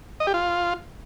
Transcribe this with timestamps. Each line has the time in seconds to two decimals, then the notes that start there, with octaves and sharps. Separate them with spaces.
0.20 D#5
0.27 G4
0.34 F4